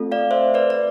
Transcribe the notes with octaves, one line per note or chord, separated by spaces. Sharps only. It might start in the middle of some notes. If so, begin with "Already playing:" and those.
Already playing: A3 C4 F4 A4
D5 F5
C5 E5
B4 D5
D5